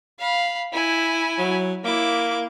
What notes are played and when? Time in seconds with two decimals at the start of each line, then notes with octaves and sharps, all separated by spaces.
0.20 F5 B5
0.73 E4 G#5
1.39 F#3
1.85 A#3 E4 D6